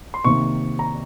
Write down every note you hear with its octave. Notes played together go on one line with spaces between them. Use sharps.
C6
C3 D#3 A#3 C#6
A#5